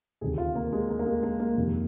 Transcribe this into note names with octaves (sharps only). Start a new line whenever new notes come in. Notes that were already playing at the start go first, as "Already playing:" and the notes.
D2 C3 D#3 G#4
F4
A#3
G#3
A#3
A#3
G#3
A#3
A#3
F2 C3 D#3